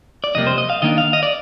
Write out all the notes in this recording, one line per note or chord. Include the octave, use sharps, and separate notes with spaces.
D5
F2 C3 G3 A#3 D#5
C5
D#5
F5
D#3 A#3 D4 D#5
F5
D#5
D5